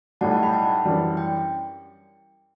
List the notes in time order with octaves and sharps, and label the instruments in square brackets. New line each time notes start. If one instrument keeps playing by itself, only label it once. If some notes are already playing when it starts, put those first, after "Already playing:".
[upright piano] B1 A2 G3 [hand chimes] F#5 A5
[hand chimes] F#5 A5
G5 B5
F#5 A5
[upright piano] F#2 E3 G3 D4
[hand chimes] G5